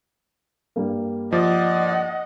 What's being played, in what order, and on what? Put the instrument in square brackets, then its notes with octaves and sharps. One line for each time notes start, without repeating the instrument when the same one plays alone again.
[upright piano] G2 G3 A#3
[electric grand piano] F3 [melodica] D5 [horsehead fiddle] D#5 F#5